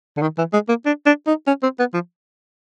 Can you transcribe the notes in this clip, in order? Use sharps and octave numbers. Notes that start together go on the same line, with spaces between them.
D3
D#3
E3
G#3
A#3
D4
D4
D#4
C#4
C4
B3
F3